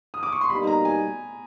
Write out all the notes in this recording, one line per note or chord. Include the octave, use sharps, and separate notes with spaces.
D#6
D6
C#6
C6
B2 G3 A#3 D#4 B5
A#5
G#5